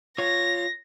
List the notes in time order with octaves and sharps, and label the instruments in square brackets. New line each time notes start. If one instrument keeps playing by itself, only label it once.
[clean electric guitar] F4 C#5 [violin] A#6